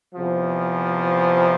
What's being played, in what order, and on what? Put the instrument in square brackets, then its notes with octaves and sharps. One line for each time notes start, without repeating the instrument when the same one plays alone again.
[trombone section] E2 C3 F3